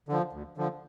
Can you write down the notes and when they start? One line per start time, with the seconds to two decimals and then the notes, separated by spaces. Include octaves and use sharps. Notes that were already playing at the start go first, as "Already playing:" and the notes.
0.08 D3 F3
0.33 D2
0.57 D3 F3